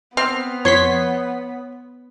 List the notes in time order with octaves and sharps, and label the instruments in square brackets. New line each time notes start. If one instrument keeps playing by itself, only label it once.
[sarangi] B3 [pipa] C4 [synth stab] F6
[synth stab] F2 C6 B6 [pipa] C#5